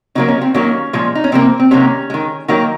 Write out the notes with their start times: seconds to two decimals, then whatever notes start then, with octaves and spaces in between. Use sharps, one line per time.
0.15 C#3 F#3 A#3 D#4
0.28 C#4
0.41 C4
0.54 D#3 F#3 A#3 C#4
0.93 A#2 F3 G#3
1.15 D#4
1.24 C#4
1.32 C3 F3 A#3 C4
1.60 C4
1.71 C3 D#3 F#3 A#3 C#4
2.10 D#3 G#3
2.48 D#3 F#3 A#3 D#4